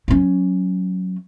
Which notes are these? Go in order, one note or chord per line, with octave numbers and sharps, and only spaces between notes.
F#3 C#4